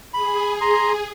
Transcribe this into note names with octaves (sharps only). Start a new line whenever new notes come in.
G#4 B5
A#5 C6